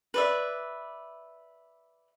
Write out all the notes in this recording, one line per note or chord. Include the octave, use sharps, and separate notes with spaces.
B4 D5 E5